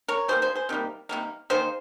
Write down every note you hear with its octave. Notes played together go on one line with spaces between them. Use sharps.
A#4 C#5
D#3 G3 A#3 G#4 C5
G#4 C5
G#4 C5
C3 D#3 G3 A#3
C3 D#3 G3 A#3
D#3 A#3 G#4 C5